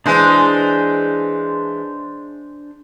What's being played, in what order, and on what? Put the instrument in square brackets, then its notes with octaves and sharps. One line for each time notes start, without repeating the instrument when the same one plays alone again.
[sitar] E3 G#3 [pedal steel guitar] D4 C5